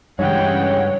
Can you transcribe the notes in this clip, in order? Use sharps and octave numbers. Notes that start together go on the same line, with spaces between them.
G2 C#3 E3 G#3 C#5 F#5 G5